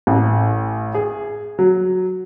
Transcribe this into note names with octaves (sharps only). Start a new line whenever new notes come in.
A1
G#4
F#3